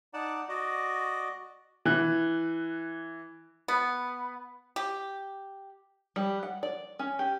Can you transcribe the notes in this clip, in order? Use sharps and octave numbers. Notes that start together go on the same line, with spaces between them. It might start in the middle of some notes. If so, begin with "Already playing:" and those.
D#4 D5 F#5 A5
F#4 D5 D#5
E3 F#6
B3
G4
G3
F#5
D5
C#4
G4